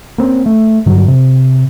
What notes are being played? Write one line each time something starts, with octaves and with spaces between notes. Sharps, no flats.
A#3 C4 C#4
A3
G2 D3 F#3
C3